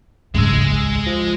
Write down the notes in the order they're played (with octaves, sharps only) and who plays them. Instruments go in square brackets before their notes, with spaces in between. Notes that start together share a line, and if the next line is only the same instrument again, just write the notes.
[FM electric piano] G#1 C#2 E6 [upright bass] G#2 C#3 [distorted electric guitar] G#3
[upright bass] D#2
[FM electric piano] F3 A#6